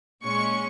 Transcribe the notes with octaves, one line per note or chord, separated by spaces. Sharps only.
A#2 G#3 C#4 C#6